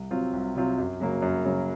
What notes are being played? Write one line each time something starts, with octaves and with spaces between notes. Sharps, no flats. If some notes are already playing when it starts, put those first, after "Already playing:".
Already playing: C2
C3 F#3 C4 F4
C2
C3 F#3 C4 F4
F#2
C#3 F#3 A#3
F#2
C#3 F#3 A#3